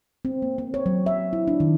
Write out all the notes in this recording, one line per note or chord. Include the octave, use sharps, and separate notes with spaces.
C4
A#3
C4
C#5
F#3
E5
E4
D4
D#3